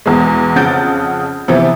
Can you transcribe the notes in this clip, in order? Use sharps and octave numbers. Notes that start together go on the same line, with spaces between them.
E2 B2 G#3
F2 C#3 F#5 G6 A6 D7
C3 E3 F3 B3